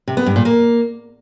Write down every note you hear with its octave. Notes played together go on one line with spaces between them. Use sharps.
C3
B3
G2
A#2
A#3